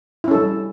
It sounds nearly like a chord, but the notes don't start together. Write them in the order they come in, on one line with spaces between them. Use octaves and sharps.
E4 C#4 A4 G3